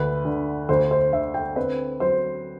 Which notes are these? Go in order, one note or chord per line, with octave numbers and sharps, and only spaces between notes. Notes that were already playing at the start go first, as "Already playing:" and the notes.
Already playing: D2 B4
D3
D2 C5
C5
D3 E5
G5
C4 B4
F#3 C5